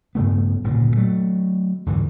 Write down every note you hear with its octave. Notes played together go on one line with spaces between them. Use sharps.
G2 C#3 A3 B3
D1 G2 A#2 C#3
F#3 A3
D#2 G#2 D3 E3